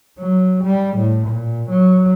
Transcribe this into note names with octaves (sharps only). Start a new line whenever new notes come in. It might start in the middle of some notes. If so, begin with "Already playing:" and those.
F#3
G3
A2
A#2
F#3